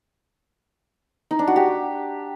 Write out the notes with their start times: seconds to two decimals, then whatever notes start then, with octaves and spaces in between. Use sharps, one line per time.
1.31 D#4
1.39 D4
1.47 F#4
1.56 G4